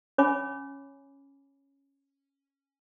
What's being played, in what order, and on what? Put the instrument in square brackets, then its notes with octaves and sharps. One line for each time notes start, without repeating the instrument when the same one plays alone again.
[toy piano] C#4 C#5 G#5 B5 D6